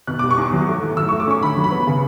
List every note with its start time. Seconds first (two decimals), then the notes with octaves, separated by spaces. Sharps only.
0.07 B2 F#6
0.19 G3 D6
0.31 C#6
0.38 E2 D6
0.53 F#3
0.68 A3
0.82 A2
0.97 F#3 E6
1.09 A3 C#6
1.20 D6
1.28 C#4 C#6
1.42 D3 B5
1.57 F#3
1.64 B5
1.72 B3
1.87 C#3